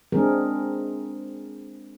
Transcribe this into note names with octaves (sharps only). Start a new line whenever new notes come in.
G#3 C4 D4 G#4 A#4